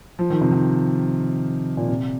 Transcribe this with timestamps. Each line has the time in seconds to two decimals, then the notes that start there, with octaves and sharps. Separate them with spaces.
0.19 F3
0.30 D#3
0.41 C3
0.51 D#3
1.77 A#2
1.88 C3